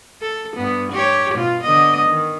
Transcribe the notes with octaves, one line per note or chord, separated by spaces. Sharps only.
A4
G2 B3
G4 C#5
B2 F4
D3 B3 D#5
D#3